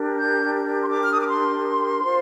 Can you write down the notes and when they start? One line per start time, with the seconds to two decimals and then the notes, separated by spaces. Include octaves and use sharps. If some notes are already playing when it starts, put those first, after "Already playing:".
Already playing: D4 G4 A#4
0.17 G6
0.83 C6
0.90 D6
1.03 F6
1.11 D#6
1.20 D6
1.27 C6
2.01 F4 C5